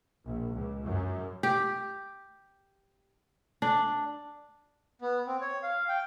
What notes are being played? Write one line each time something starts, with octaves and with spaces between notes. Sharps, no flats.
A#1
C#2
F#2
G4
D4
B3
C4
C#5
F5
G5